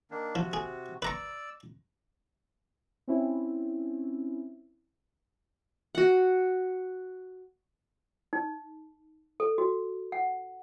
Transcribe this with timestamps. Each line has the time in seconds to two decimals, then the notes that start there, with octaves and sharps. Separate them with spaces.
0.11 D#3 A#3 D4
0.35 C3 F3 F#4
0.53 G#4
1.02 B4 D5 A#5 C#6 E6
3.08 C4 C#4 E4
5.95 F#4 F#5
8.33 D#4
9.40 A4
9.58 F#4
10.12 F#5